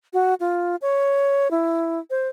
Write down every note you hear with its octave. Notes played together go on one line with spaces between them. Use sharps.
F#4
F4
C#5
E4
C5